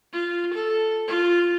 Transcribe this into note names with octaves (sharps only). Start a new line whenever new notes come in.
F4
A4
F4